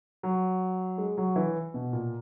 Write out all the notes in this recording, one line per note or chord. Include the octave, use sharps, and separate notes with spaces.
F#3
G#3
F#3
E3
B2
A#2